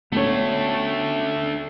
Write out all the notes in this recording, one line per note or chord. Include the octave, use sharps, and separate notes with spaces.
D2 A3 B3 C#4 D4 C#5